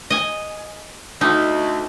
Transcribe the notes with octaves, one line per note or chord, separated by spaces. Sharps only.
D#5 G#5
D2 D#4